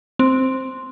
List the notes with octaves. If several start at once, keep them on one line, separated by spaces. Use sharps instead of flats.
C4